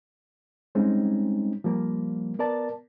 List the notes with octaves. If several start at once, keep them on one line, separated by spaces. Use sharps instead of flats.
G3 G#3 C4 C#4 D#4 G#4
F3 G3 A#3
B3 A#4 D5 A5